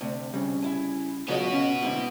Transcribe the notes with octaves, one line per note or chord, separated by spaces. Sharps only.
D2 C3
C#3 G3
E4 G#5
C#2 C#3 F#3 B3 F4 F#4 D#5
C#4
G#2 D3 C4 E4